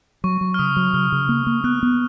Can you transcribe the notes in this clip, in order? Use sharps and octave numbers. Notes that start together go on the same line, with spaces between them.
F#3 C#6
F#3
F6
C#3 D#6
F#3
C#3 F6
C#3
A#3
A#3
B3 F#6
B3